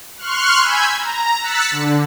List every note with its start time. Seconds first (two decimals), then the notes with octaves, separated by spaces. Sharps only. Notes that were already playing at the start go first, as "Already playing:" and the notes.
0.17 C6 C#6 F6 F#6
0.59 G#5 B5 E6 G6 G#6
0.97 A#5
1.40 E6 F#6 A6 B6 C#7
1.71 D3